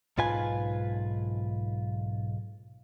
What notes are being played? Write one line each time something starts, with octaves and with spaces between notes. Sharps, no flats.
B1 G#2 F4 B4 G#5